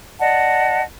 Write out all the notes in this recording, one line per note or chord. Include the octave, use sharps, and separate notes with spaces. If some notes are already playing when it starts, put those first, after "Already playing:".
D5 D#5 F#5 A5